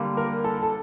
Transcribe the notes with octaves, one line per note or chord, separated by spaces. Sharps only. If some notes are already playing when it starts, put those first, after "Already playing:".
Already playing: D3 G3 A#3
A#4
A4
A4